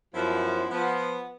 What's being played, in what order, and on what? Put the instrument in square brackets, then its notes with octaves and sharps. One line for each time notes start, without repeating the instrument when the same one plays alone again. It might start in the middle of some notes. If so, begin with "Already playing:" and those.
[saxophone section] F#2 F3 [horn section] B3 E4
[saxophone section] F3 [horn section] B3